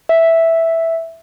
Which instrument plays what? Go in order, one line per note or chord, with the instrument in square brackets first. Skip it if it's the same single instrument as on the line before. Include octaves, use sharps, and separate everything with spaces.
[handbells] E5